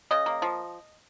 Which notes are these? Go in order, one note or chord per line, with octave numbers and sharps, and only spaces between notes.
C#3 D#5
A#3
F3